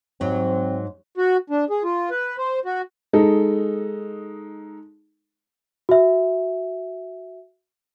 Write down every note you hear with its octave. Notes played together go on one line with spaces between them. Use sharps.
G#2 F#3 C4
F#4
D4
G#4
F4
B4
C5
F#4
G#3 D#4 A4
F#4 E5